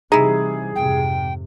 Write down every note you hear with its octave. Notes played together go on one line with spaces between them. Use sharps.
C3 E3 G3 D#4 E4 G#4
F2 G#2 C3 G5